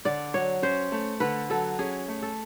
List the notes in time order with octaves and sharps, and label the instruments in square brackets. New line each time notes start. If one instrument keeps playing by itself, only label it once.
[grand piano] D3 [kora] D5
[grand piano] F#3 [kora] C#5
[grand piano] C#4 [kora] C5
[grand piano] A3
[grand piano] D3 [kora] B4
[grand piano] F#3 [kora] A4
[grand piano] C#4 [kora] G#4
[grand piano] A3
[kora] A4